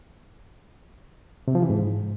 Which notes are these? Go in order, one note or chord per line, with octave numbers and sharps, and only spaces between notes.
C3
F3
E3
G#2